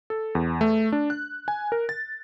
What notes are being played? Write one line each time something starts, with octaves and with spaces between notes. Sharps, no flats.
A4
E2
A3
D4
F#6
G#5
A#4
A6